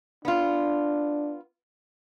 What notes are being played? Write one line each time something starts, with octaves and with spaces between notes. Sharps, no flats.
B3 D4 F4